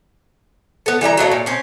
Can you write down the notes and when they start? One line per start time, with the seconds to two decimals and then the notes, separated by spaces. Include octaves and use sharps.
0.86 B3 A4
1.01 E3 G3 D5 A#5
1.17 F#3 A#3 D#4 A4
1.32 A#2
1.46 C4 C#4